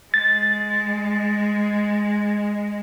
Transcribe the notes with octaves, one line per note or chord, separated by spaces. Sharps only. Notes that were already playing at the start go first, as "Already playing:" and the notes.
G#3 A6